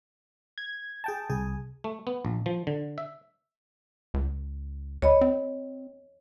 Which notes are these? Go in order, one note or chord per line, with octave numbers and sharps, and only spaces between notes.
G#6
G#4 G5 A5
C2 G#4 G#5
A3
B3
A#1
F3
D3
E5
C#2
D2 C#5 D#5 B5
C4